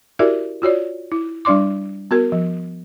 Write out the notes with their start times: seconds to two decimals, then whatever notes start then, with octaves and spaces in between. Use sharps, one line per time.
0.19 E4 F#4 G4 A#4 D5 E5
0.62 F4 F#4 C#5 D5
1.12 E4
1.45 G3 D4 D5 C6 D6
2.11 B3 F#4 A#4
2.32 F3